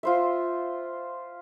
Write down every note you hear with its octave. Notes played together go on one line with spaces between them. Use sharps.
F4 C5 E5